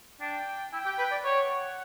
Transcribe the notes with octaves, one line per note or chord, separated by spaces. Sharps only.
D4 G5
E4 G5
G4
B4
D5
C#5 F#5